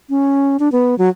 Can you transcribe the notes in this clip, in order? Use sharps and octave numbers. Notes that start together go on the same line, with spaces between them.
C#4
D4
B3
F#3